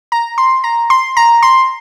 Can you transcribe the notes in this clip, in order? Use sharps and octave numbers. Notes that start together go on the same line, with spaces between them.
A#5
C6
A#5
C6
A#5
C6